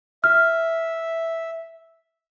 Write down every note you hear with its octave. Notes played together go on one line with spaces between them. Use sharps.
E5 F6